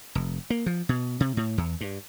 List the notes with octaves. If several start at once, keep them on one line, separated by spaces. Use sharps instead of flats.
F1
A#3
F3
B2
C3
A2
E2
G2